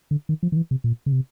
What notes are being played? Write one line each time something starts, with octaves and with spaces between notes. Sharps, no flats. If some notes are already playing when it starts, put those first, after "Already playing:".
D3
D#3
F3
D#3
E3
C3
A#2
C#3
C3